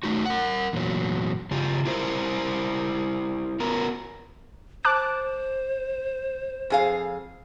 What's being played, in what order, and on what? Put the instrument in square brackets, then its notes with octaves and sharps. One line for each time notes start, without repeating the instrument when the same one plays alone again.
[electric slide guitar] A3 D#4 F#4
A#4 F#5
E2 A#2 F#3
C#3 F4 G4
E4 G4 A#4 C5
B3 F#4 A#4
[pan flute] C5 [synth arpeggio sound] A5 D6 F#6
[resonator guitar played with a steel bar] F2 G#4 F5